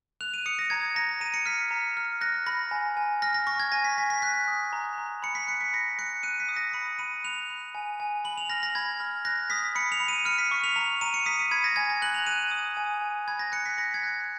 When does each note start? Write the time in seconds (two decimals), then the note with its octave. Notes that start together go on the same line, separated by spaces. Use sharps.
0.21 F#6 F7
0.34 D#7
0.46 D#6 C#7
0.59 A#6
0.70 A#5 G#6
0.95 A#5 A#6
1.21 A#5 D#7
1.34 C#7
1.46 F6 B6
1.71 A#5
1.97 F6
2.21 F#6 A#6
2.46 B5 A#6
2.71 G#5
2.97 G#5
3.22 F6 A#6
3.34 A#6
3.47 C#6 A#6
3.60 G#6
3.72 G#5 A#6
3.85 B6
3.97 G#5 B6
4.10 B6
4.22 F#6 B6
4.48 D#6
4.73 A#5
4.98 A#5
5.22 B5 C#7
5.35 B6
5.48 F#6 C#7
5.61 B6
5.73 B5 A#6
5.99 F#6 C#7
6.23 F#6 D#7
6.40 B6
6.49 D#6
6.57 A#6
6.73 B5 C#7
6.99 B5 D#7
7.24 F#6 F7
7.50 B5
7.75 G#5
8.00 G#5
8.24 B5 F#7
8.37 F7
8.50 F6 A#6
8.63 A#6
8.75 B5 G#6
9.00 F6
9.25 F#6 A#6
9.50 D#6 B6
9.75 B5 C#7
9.92 F7
10.00 B5
10.08 D#7
10.25 F6 C#7
10.38 B6
10.51 C#6
10.64 F7
10.76 A#5 F7
11.01 A#5 D#7
11.14 C#7
11.26 D#6 B6
11.39 D#7
11.51 B5 G#6
11.64 A#6
11.76 G#5 G#6
11.90 A#6
12.02 F#6 F#7
12.14 F7
12.27 F#6 D#7
12.51 D#6
12.77 G#5
13.02 G#5
13.28 B5 G#6
13.39 A#6
13.52 F#6 C#7
13.66 B6
13.77 B5 A#6
13.94 G#6
14.03 F#6